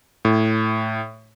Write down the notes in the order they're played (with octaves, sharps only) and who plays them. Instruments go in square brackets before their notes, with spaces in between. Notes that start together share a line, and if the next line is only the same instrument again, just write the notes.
[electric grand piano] A2